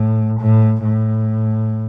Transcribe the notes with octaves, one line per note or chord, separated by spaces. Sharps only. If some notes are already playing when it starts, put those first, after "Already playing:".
Already playing: A2
A2
A2